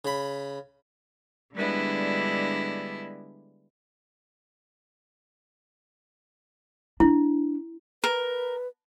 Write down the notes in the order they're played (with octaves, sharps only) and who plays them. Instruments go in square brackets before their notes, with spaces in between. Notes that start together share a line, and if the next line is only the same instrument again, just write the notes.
[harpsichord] C#3 B5
[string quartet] D3 G3 G#3 B3 D4 E4
[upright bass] D4 [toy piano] E4
[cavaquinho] A#4 [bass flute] B4